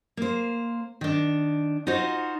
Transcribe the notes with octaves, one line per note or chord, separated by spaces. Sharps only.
A#3 C5
D#3 D4
D#4 F4 F#4 C5 D#5